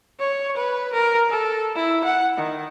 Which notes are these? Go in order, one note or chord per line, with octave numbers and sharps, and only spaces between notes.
C#5
B4
A#4
A4
E4
F#5
D#3